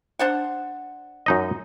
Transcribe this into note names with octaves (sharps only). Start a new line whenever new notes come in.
D4 C5 F#5
F#2 D#4 D#5